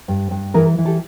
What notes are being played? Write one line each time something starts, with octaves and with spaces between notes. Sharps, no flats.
G2
G2
E3 G#4 A#4
E3
G4 A4